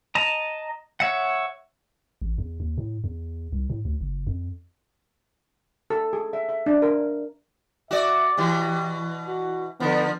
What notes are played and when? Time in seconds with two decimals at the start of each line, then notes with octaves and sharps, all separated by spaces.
0.15 D#5 A5 A#5
1.00 C#5 E5 F#5
2.22 A1
2.38 E2
2.60 D#2
2.78 A2
3.04 E2
3.53 C2
3.70 A2
3.85 D2
4.01 F#1
4.27 F2
5.90 A4
6.13 G#4
6.33 E5
6.49 E5
6.66 D4
6.82 A#4
7.91 F#4 D5 E5
8.37 B2 E3 G4
9.28 F#4
9.80 D3 F3 B3